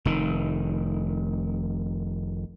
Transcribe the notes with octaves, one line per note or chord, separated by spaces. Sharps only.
F1 D#3